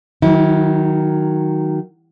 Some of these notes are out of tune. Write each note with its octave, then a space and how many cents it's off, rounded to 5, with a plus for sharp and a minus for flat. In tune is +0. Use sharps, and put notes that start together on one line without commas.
D#3 +0 F#3 +0 E4 -40